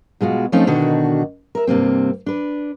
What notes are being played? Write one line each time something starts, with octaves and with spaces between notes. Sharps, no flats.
B2 G#3 F4 F#4
F3 A3 C4 C#4 D#4 F4
B2 D3 D#3 D4 F#4
A#4 E5
G2 C3 A#3 C4
D4 B4